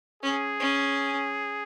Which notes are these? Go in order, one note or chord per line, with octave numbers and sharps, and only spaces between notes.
C#4 G#4
C#4